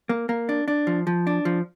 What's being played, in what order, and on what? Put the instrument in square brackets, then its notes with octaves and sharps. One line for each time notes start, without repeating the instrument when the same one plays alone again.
[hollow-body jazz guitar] A#3
A#3
D4
D4
F3
F3
D4
F3